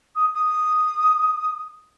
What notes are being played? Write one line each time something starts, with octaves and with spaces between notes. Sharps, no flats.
D#6
D#6